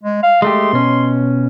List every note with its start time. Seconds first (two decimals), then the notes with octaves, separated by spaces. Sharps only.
0.03 G#3
0.23 F5
0.42 G#3 A3 G4 C6
0.73 B2 C#4